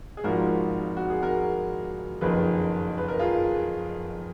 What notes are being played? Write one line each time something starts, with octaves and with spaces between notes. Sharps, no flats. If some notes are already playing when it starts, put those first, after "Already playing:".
G#4
G#1 G#2 F3 F#4 A#4
F#4
G#4
F#4 A#4
F#1 F2 D#3 G#4 B4
B4
A#4
F4 G#4